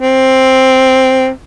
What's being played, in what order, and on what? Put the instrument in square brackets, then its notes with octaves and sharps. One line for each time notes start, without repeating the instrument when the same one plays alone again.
[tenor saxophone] C4